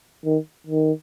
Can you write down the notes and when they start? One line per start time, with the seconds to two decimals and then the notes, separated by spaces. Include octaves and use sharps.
0.25 D#3
0.67 D#3